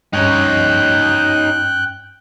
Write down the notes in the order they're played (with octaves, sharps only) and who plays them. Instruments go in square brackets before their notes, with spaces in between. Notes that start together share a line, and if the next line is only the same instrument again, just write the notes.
[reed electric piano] G2 C#4 [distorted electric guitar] D#4 C#5 [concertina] G5 F#6